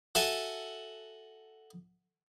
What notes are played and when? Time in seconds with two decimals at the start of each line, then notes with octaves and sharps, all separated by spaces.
0.15 F#4 A4 E5 F#5 G#5